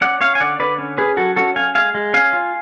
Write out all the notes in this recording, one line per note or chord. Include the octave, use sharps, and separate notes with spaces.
C#4 D5 F#5
C#4 C#5 F5
G#5
D3 D5 F#5
D3 B4 D5
C#4
C#4 G#4 B4
F#3 F#4 A4
C#4 F#4 A4
C#4 F5 G#5
G#3 F5 G#5
G#3
C#4 F5 G#5
F4